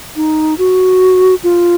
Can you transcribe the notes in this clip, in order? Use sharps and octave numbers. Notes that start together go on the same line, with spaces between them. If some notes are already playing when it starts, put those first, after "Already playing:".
D#4
F#4
F4